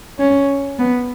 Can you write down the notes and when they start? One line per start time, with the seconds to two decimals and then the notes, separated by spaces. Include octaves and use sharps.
0.19 C#4
0.79 B3